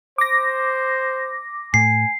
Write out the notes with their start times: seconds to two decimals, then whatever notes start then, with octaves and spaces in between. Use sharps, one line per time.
0.18 C5 D6 A#6
1.74 A2 G#5 C7